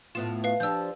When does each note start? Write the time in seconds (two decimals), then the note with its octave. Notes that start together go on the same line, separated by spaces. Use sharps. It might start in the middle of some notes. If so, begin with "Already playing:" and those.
0.15 A2 B3 F4 E7
0.44 B4 F5
0.60 F3 D4 G4 E6 G6